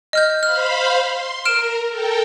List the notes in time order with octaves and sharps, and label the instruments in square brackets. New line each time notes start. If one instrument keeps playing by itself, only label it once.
[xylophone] D#5 F6 G6
[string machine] C5 F5 B5 [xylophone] F6
[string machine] C6
[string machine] A#4 [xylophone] F6 D7 E7
[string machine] A4 A#4 G5